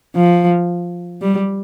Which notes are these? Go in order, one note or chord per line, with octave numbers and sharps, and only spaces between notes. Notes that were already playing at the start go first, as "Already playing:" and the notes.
F3
G3